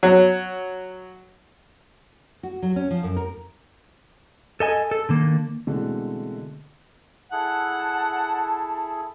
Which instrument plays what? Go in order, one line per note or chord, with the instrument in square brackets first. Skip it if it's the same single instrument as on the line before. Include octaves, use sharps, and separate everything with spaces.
[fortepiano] F#3
[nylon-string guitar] F#4
F#3
C#4
F3
F#2
A#4
[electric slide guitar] A4 D#5 G#5
A4
D3 D#3 A#3
[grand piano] B2 D3 E3 G#3 A3 C4
[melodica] E4 G#4 A4 [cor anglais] F#5 [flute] A5